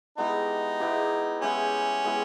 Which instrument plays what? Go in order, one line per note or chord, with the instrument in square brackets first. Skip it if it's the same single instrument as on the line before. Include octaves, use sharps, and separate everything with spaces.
[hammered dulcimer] G#3 B3 E4 G4 [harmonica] D#4
[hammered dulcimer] G#3 B3 E4 G4
[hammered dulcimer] G#3 B3 E4 G4 [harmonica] C#4
[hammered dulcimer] G#3 B3 E4 G4